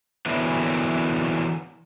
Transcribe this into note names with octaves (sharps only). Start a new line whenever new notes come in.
D3 E3 F#3 A#3 B3